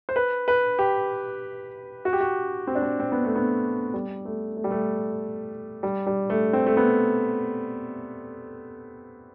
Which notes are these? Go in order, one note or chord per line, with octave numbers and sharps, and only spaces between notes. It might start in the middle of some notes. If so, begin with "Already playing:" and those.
C5
B4
B4
G4
F#4
G4
F#4
C4
D4
C4
C4
B3
A3
B3
G3
A3
A3
G3
A3
G3
G3
A3
C4
A3
B3